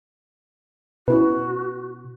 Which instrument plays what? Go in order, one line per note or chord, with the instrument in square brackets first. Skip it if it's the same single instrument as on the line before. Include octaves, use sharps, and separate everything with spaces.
[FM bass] B2 [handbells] C#4 E4 B4 [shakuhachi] F#4